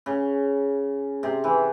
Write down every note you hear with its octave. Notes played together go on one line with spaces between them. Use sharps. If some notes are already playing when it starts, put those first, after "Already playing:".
C#3
C3
E3